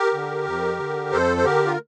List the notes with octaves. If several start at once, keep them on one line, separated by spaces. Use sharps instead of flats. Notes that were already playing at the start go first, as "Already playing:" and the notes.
Already playing: G4 A#4
D3
F2
D3
F2 A4 C5
C5
D3 G4 A#4
F4